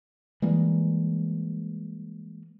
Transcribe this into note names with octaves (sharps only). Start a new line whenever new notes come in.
E3 G3 G#3 A#3